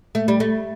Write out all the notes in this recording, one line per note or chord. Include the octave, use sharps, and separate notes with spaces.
A3
G3
A3